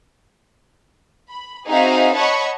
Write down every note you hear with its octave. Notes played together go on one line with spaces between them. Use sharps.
B5
C4 D#4 F#4 G#4 E5 F5
C#5 D#5 F#5 A5 B5 C#6